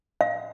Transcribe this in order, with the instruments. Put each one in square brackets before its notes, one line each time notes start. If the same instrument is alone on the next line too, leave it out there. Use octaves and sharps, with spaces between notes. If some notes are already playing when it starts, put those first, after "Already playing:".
[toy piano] F5